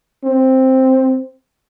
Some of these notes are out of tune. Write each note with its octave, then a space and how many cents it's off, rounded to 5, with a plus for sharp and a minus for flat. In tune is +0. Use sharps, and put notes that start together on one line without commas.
C4 +5